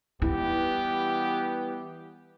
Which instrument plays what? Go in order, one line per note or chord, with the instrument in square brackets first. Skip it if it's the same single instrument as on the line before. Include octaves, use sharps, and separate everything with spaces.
[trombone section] E3 G3 B3 [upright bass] E4 [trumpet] G4